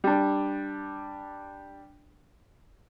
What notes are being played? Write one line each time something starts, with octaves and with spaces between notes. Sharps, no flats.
G3 D4